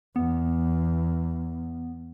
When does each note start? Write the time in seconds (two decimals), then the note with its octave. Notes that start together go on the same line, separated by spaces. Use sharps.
0.16 E2 B3